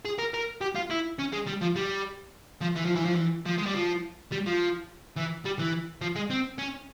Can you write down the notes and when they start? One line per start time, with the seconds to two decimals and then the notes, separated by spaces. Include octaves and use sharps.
0.05 G#4
0.19 A#4
0.34 A#4
0.61 G4
0.76 F4
0.91 E4
1.19 C#4
1.33 G#3
1.47 G3
1.62 F3
1.76 G3
2.61 F3
2.75 E3
2.85 F3
2.95 E3
3.05 F3
3.15 E3
3.46 F3
3.58 G#3
3.66 G3
3.74 F3
4.32 G3
4.46 F3
5.16 E3
5.45 G3
5.59 E3
6.02 F3
6.16 G#3
6.30 C4
6.58 C#4